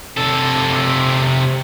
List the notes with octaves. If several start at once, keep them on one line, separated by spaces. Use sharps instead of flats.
C3 A4